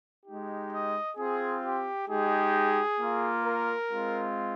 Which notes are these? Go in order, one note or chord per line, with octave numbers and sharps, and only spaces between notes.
G#3 D#4 G4
D#5
C4 F4 G#4
G4
G#3 D#4 G4 G#4
A#3 F4
A#4
G#3 C4 F4